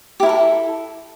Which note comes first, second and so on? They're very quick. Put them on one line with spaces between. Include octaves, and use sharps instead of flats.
G4 E4 A#4 A4